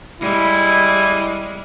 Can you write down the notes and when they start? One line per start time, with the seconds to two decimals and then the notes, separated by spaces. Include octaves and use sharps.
0.20 G3 G#3 E4